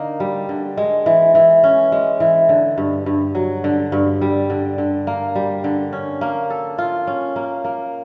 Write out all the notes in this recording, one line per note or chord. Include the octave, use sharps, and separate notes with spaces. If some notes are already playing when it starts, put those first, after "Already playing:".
Already playing: D3 A#3 D#4
G3
D3
G#3
E3
E3
C#4
G#3
E3
D3
G2
G2
F#3
D3
G2
G3
D3
D3
A#3
G3
D3
C#4
A#3
A4
F4
C#4
A#3
A#3